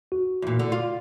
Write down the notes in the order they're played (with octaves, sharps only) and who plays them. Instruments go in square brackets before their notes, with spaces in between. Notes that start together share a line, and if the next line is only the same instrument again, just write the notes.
[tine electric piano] F#4
[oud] E2 A#2
D3
F4